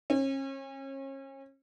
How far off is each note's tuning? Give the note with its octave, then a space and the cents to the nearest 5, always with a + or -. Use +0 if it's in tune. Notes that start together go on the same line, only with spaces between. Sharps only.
C#4 -35